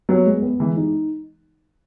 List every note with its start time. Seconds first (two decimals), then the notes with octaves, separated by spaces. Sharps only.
0.09 F#3 B3
0.26 G#3
0.42 B3
0.60 E3 G#3
0.77 D#4